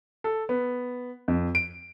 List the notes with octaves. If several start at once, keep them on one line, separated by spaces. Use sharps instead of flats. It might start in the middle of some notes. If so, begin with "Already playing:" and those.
A4
B3
F2
D7